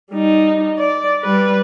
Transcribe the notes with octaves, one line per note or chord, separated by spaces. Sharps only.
G3 D#4
D5
G3 B4